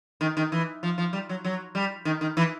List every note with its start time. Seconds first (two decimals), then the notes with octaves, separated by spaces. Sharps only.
0.21 D#3
0.37 D#3
0.52 E3
0.83 F3
0.98 F3
1.13 G3
1.29 F#3
1.45 F#3
1.75 G3
2.05 D#3
2.21 D#3
2.37 E3